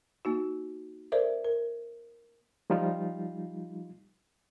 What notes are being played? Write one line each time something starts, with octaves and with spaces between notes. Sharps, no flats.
A#3 D#4 F#4
A4 A#4 C5 D5 E5
A#4
F3 G3 D#4 F4